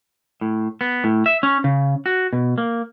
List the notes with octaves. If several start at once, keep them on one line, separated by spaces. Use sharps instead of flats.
A2
B3
A2
E5
C#4
C#3
F#4
B2
A#3